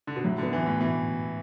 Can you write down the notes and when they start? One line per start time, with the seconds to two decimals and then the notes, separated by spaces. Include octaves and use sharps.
0.07 D3
0.16 B2
0.24 A2 F#3
0.38 D3 B3
0.53 E3
0.61 B3
0.66 A2
0.80 B2 E3